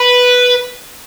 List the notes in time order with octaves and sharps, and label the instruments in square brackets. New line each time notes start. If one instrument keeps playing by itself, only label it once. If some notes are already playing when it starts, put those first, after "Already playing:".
Already playing: [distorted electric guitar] B4